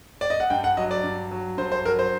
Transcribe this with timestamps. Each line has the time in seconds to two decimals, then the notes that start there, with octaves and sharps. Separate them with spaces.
0.21 D5
0.30 D#5
0.40 F#5
0.50 G2 G5
0.64 F#5
0.77 F#3 D#5
0.91 D5
1.04 G2
1.31 F#3
1.58 G2 C5
1.72 C5
1.85 F#3 A#4
1.99 C5